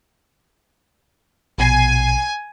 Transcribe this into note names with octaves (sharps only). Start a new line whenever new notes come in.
A#1 B2 G#5 C7